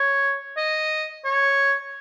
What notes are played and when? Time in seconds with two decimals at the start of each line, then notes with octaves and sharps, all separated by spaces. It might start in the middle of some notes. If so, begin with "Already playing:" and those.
Already playing: C#5
0.57 D#5
1.25 C#5